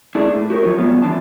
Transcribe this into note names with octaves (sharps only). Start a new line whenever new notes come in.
A3 D4 E4 G#4
A2
F#4 G4 A#4 C#5
F#2 F3 F4 C#5
F#3 G3 A3 B3 F4
G2 E3 D4 F4 A5